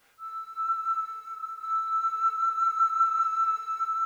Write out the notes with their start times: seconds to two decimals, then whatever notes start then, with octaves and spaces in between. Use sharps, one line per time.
0.19 E6
1.57 E6